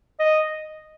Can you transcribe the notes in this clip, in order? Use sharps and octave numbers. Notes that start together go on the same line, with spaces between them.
D#5